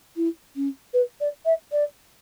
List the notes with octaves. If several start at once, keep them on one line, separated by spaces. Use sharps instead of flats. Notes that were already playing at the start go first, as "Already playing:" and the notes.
E4
C#4
B4
D5
E5
D5